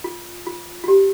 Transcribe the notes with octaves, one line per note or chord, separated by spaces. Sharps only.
F4
F4
F4
G4